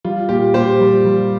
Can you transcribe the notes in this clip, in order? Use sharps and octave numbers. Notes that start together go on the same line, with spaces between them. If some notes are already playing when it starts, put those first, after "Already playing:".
G3 F4
A#2 G4
A#2 G4 C5
G3
G3